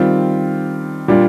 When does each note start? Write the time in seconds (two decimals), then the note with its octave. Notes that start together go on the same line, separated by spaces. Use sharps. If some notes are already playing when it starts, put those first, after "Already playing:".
Already playing: D#3 G3 C4 F4
1.08 A#2 G3 D4 F4